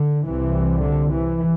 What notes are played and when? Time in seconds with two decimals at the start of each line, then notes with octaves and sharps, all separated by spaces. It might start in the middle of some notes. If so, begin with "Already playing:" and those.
Already playing: D3
0.25 C2 C3 E3
0.83 D3
1.12 E3